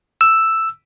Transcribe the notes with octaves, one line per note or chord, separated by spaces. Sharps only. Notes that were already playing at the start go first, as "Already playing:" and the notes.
E6